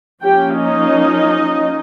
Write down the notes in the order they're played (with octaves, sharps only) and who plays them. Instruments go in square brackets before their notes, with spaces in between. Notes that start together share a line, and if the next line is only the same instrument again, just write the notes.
[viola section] F3 A#3 C#4 G4 G5
D#4 D#5